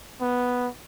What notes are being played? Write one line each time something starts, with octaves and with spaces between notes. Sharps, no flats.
B3